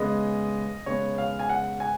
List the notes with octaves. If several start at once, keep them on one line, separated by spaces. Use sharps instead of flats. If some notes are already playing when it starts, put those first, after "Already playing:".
Already playing: C#3 G#3 B3 D#5
C#3 G#3 B3 C#5
F5
G#5
F#5
G#5